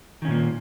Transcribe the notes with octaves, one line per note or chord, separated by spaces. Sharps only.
A#2 D#3 A#3 C#4